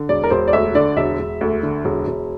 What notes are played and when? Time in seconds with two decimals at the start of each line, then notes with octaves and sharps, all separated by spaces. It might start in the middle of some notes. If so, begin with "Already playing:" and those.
Already playing: D3
0.09 E1 D5
0.24 A#4
0.30 E1 C5
0.48 D5
0.53 D2 E5
0.75 D3 D5
0.97 E1 E5
1.19 E1
1.41 D2
1.63 D3
1.85 E1
2.08 E1